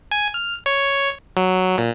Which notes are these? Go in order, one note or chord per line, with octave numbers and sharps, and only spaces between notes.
G#5
F6
C#5
F#3
A#2